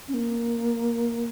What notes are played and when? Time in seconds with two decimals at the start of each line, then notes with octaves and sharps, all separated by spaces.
0.08 C#4
0.14 A#3